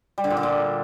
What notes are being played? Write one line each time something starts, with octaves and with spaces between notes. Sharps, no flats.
G3
D3
A#2
D3
A#2